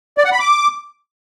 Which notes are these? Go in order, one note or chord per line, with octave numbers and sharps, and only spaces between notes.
D5
F#5
B5
D6